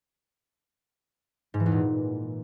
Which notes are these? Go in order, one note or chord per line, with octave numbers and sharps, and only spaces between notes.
G#2
E3
E2
A#2